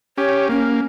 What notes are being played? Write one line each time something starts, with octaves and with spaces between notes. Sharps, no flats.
C#4 G4 C#5
A#3 C#4